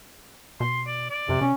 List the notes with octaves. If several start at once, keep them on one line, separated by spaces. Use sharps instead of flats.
B2 C6
D5
D5
F#2 C3
C3 C#4